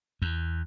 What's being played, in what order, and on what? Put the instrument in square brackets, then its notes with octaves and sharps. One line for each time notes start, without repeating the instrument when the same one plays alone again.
[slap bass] E2